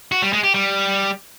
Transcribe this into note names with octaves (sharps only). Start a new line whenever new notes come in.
F#4
G3
G#3
G4
G3